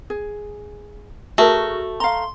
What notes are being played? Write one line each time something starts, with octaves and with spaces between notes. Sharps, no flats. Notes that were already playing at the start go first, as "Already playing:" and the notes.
G#4
A3 F#4 G#4 A#4
F5 A#5 C6